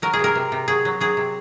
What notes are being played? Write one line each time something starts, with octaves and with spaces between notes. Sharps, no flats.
F#3 A#4
G#4
C3 A#4
C3
C3
F#3 G#4
F#3
F#3 G#4
C3